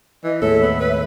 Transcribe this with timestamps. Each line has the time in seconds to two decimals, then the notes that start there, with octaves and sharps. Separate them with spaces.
0.24 E3 D#5
0.42 D#2 A2 G#3 A4 C#5 E5
0.62 B3
0.80 B4 C#5